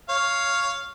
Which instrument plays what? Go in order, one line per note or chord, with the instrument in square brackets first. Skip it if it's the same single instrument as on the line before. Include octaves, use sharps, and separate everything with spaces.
[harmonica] C#5 F5